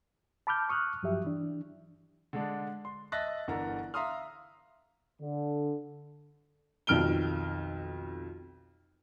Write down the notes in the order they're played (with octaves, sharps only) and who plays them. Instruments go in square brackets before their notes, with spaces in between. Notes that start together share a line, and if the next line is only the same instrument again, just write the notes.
[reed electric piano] A5 B5 D6 F6 G6
C#6 D#6 F6 F#6
G2 F3 F#3 G4 E5
E3 D4
[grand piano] D3 G#3 D4
C6
D#5 E5 A5 F#6 A6 A#6
G1 D3 E3 A#4 A#5
E5 F5 A#5 C6 D#6 F6
[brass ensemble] D3
[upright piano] B1 F2 D#3 F6 D7 G7